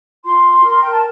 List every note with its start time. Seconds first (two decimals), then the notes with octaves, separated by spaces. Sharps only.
0.24 F4 C6
0.63 A#4
0.81 G5
0.92 A5